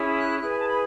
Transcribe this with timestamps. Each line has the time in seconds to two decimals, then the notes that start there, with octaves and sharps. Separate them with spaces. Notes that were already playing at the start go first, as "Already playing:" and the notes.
Already playing: C#4 E4 G#4
0.20 F#6
0.39 E4 G#4 B4 F#6
0.49 G#5
0.59 A5
0.68 B5